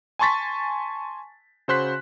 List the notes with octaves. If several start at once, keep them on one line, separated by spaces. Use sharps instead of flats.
G#5 A5 C6 C#6 A6 B6
C#3 F#4 C5 C6 F#6 B6